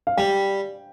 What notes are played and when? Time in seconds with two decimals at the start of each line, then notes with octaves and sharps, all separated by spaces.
0.07 F5
0.17 G3 G5